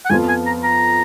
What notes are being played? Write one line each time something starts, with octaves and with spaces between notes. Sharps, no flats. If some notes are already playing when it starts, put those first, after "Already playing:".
F#5
F2 F3 B3 F4 G#5
G#5
A#5
A#5